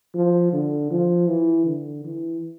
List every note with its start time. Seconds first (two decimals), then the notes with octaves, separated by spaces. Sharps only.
0.15 F3
0.53 D3
0.91 F3
1.28 E3
1.66 D3
2.04 E3